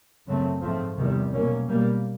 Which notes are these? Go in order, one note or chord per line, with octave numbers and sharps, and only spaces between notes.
F#2 C#3 F#3 A3 C4
G#2 F3 A3 C4
E2 C3 D#3 G3
B2 F#3 A#3 C#4
B2 G3 A#3